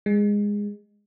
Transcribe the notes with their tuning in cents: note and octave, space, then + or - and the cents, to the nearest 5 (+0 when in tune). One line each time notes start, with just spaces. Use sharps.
G#3 -15